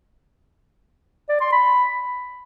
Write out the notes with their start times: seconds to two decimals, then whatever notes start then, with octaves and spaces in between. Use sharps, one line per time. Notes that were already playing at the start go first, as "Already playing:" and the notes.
1.29 D5
1.40 C6
1.52 B5